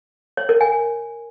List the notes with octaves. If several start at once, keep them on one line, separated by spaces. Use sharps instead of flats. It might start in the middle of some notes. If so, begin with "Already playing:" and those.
C#5
A#4
G#5